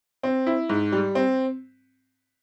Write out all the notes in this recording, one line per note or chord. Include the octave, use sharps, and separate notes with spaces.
C4
E4
G#2
G3
C4